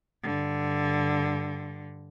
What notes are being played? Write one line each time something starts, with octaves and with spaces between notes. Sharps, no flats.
G2 D3